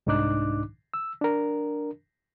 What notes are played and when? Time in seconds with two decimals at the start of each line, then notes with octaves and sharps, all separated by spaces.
0.07 C2 G#2 D4 D#4 D6 F#6
0.94 E6
1.21 D4 A#4